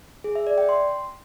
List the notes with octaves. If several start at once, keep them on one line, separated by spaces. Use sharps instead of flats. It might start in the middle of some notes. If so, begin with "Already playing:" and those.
G#4
E5
D5
G5
C6